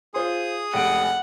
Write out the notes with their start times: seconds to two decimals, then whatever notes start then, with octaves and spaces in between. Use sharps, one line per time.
0.14 F4 G#4 C5 C6 D#6
0.74 F1 C#2 F#5 D7